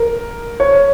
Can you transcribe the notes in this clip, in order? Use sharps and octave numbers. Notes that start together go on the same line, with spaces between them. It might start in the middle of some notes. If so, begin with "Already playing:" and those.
Already playing: A#4
C#5